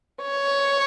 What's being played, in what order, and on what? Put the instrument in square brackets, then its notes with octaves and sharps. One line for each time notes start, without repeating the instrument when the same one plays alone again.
[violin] C#5